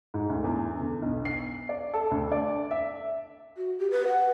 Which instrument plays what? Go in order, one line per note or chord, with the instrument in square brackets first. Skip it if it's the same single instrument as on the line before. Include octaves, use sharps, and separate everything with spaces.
[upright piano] G#2
D2
E2
D3
B1
C7
D5
A4
D2
D5
E5
[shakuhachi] F#4
G4
B4
F#5